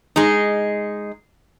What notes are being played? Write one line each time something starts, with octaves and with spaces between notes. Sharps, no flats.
G#3 D#4